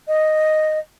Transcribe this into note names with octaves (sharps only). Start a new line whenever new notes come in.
D#5